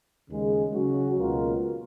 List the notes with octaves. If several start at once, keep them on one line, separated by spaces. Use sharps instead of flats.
D#2 C#3 G#3
C#3 F#3 C#4 F#4
C#2 B2 A#3 F4 A#4